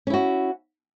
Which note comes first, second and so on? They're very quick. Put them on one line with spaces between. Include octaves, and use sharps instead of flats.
C#4 E4 F#4